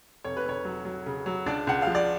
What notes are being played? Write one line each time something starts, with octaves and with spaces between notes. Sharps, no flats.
F1 C#5
B4
F1 C#5
F#3
F#3
C#3
F#3
C#2 D4 D5
C#2 F#5
F3 F5
D5